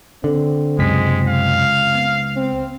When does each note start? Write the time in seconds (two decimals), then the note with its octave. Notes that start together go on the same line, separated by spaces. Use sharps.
0.24 D3 C4
0.79 C#2 F#2 C3 G#3 B6
1.28 F5
1.95 B3
2.36 C4